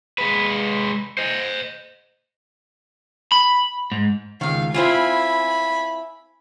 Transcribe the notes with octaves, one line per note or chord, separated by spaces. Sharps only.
G#3 B4
C5 D#5
B5
G#2
C#2 D#3 F5
C4 E4 F4 G#5 B5